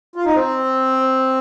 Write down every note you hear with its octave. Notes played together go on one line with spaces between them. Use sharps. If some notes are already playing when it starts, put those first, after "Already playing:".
F4
D#4
C4